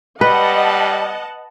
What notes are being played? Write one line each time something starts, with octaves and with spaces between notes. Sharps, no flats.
G3 B4 D#5 F#5 A5